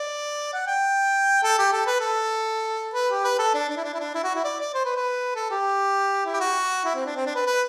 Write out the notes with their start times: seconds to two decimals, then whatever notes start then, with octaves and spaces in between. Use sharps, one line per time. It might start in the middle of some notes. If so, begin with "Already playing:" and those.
Already playing: D5
0.53 F#5
0.67 G5
1.44 A4
1.59 G4
1.73 A4
1.87 B4
2.00 A4
2.94 B4
3.09 G4
3.24 B4
3.39 A4
3.54 D4
3.69 D4
3.77 E4
3.84 D4
3.94 E4
4.00 D4
4.15 E4
4.24 F#4
4.35 E4
4.44 D5
4.60 D5
4.74 C5
4.85 B4
4.95 B4
5.36 A4
5.51 G4
6.25 E4
6.34 G4
6.40 F#4
6.85 E4
6.95 C4
7.06 D4
7.16 C4
7.26 D4
7.35 B4
7.46 B4